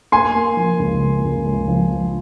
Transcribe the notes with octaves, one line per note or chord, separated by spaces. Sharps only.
A#3 G#5 C6
A#3
F3
C#2
A#3
C#2
C#2
F3
F3